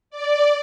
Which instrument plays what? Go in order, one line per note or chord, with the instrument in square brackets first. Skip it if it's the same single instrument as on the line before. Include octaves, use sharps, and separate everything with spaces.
[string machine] D5